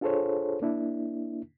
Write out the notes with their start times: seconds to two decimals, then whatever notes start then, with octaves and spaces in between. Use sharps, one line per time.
0.01 D4 F4 G#4 A4 C5 C#5
0.62 A#3 D4 E4